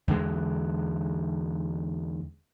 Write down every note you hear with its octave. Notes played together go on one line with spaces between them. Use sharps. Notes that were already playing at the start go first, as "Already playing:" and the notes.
E2 D3 G#3